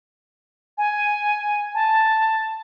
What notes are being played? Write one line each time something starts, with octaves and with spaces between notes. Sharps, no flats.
G#5
A5